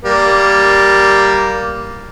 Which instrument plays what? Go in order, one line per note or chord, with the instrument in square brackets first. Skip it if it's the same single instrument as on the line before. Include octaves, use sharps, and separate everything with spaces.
[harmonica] G3 A#3